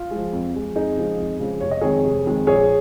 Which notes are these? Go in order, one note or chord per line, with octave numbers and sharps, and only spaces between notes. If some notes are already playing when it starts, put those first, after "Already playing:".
Already playing: F4
F3 G#3
F2
F3 G#3
F2 D#4 G#4
C#3 F3 G#3
F2
C#3 F3 G#3
F1 C#5
D#5
F2 D#3 G#3 G#4 C#5
F1
F2 D#3 G#3
A#1 G#4 C#5